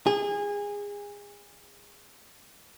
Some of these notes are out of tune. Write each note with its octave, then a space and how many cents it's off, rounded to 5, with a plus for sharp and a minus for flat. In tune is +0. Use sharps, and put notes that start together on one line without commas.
G#4 -25